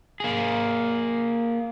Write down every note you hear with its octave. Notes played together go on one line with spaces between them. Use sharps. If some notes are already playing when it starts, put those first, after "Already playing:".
A#3 G#4